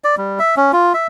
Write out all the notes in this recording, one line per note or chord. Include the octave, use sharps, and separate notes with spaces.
D5
G3
E5
C#4
F4
E5